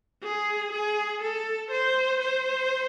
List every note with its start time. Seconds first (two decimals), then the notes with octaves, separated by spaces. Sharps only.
0.23 G#4
0.73 G#4
1.22 A4
1.72 C5
2.21 C5